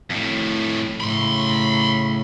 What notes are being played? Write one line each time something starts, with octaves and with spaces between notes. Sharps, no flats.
F2 A2
A2 C#3 B5 C6